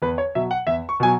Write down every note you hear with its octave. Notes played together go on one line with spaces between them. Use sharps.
E2 B4
C#5
B2 F#3 E5
F#5
E2 E5
C#6
B2 F#3 G#5